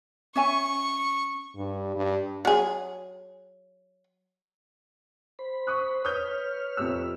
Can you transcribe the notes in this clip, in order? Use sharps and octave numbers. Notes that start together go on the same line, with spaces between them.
C#4 E5 G#5 C#6
G2
G2
F#3 G#4
C5 B5
C#6 D#6 F#6
B4 C#5 D#6 F6 G6
F2 C3 E6